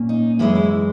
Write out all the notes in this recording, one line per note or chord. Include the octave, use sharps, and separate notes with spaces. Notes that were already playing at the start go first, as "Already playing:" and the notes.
Already playing: A#2 A#3 C#4
D#4
F#2 E3 G#3 E4
E4